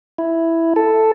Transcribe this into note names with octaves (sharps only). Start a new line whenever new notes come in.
E4
A4